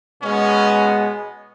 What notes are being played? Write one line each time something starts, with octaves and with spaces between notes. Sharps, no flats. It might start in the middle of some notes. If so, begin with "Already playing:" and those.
B2 G#3 B3 C#4